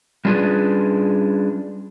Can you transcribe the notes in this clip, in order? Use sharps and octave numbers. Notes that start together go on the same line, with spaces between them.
G3 C#4 D4 F4 G#4 B4